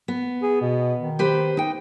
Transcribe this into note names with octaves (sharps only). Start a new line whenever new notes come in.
B3
G#4
B2
D#3
G4 B4 C5
D#4 G5